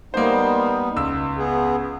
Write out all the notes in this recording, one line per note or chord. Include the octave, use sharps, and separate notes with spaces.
G3 A#3 B3 D#4 C5
C#2 E6
B3 G#4